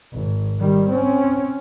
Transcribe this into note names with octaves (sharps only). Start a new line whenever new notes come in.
G#1
D#3 G3
C4 C#4